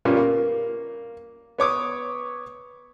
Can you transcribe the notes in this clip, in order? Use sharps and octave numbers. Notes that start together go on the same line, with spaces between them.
A#2 G3 A#3 B3 C#4
A#3
B3 C#5 D6 D#6